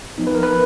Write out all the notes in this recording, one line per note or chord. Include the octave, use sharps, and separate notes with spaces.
F3 B3 D#4
B4
A#4
B4